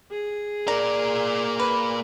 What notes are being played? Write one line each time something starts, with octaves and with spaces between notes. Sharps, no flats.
G#4
A#3 A#4 D5
B4